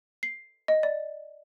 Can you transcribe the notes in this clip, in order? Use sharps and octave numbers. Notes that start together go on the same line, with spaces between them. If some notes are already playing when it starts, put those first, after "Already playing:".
C7
D#5
D5